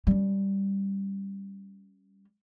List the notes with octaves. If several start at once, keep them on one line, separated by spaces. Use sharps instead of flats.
G3 C#4